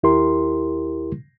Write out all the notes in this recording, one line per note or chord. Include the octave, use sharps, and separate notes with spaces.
D#2 E4 G4 A#4 C6